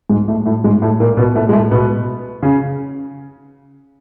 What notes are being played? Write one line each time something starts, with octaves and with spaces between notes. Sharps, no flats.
G#2 G#3
A2 A3
A2 A3
G#2 G#3
A2 A3
A#2 A#3
B2 B3
A2 A3
G#3
A2 A3
B2 B3
C#3 C#4